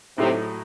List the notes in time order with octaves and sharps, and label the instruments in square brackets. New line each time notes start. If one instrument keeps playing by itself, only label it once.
[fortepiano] A2 F#3 A3 D#4 [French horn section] C3